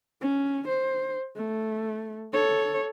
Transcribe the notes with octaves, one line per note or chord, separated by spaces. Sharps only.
C#4
C5
A3
A4 C#5